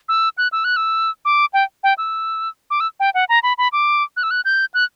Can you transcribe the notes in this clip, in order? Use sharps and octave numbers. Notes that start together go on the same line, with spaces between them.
E6
F#6
E6
F#6
E6
D6
G5
G5
E6
D6
E6
G5
F#5
A#5
B5
B5
D6
F#6
E6
F#6
G6
F#6